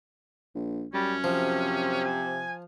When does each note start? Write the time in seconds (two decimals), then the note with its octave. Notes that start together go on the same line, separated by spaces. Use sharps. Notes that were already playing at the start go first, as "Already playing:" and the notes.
0.55 A#1
0.94 F#2 G3 C#4
1.24 C3 F3
2.04 G#5